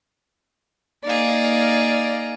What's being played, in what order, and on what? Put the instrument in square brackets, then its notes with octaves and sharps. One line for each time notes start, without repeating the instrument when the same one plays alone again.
[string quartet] A#3 D#4 G#4 [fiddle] D5 F5